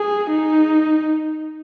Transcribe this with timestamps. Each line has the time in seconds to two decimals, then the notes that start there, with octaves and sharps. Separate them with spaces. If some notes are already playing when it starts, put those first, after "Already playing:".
Already playing: G#4
0.31 D#4